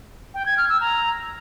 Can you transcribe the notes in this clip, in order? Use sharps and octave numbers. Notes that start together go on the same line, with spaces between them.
G5
G#6
F6
E6
A#5